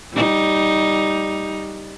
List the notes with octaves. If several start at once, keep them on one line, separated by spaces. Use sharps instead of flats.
G3 D#4